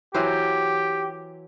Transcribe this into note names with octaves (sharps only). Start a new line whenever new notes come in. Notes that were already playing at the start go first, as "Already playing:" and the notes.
E3 F#3 G4 C5